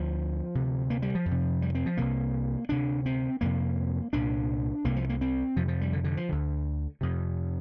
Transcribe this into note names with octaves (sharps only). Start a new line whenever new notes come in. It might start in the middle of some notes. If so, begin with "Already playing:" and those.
Already playing: D2 D3 F3
D2 C3
A#3
G3
F3
F2
C3
G3
C4
F3
C2 C3 A#3
D2 C3 D4
C4
F2 C3 A#3
C2 A#2 D4
C2 C3 A#3
F3
A#3
C4
F2 C3 F3
F3
G3
D3
D3
F3
D2 D3
F2 C3